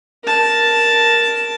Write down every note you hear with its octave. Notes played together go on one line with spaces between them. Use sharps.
A#4 A5